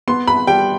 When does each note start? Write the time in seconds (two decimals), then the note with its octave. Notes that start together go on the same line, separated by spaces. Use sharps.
0.08 B3 C6
0.28 B5
0.47 G3 G5